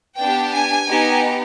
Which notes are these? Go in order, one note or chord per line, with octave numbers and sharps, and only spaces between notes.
B3 D4 G4 G5
G#5
B3 D#4 G4